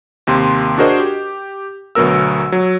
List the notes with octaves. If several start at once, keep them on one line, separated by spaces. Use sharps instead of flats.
D#2 C3 C6
D4 F#4 G#4 A#4 C5 D#5
G4
D2 B2 F#3 B3 A#4 E6
F#3